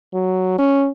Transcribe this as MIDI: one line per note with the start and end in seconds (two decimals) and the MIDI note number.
0.14 0.56 54
0.59 0.90 61